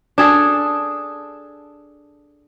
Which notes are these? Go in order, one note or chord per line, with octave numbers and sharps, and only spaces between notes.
D4 G#4 A4